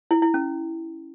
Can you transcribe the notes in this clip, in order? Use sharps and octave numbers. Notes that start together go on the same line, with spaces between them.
E4
E4
C#4